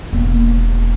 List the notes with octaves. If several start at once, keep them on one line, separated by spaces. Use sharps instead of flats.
E1 A#3